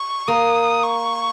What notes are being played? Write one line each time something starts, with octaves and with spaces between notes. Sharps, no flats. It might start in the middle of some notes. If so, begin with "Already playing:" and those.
Already playing: C#6
A#3 D#6
C#6